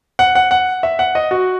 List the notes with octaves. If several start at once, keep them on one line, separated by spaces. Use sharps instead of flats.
F#5
F#5
F#5
E5
F#5
D#5
F#4